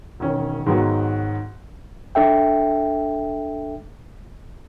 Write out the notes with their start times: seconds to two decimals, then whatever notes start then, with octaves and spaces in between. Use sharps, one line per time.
0.20 E1 D#3 C#4
0.66 G#2 D#3 F#3 G#3 B3 F#4
2.15 D4 A4 E5 G5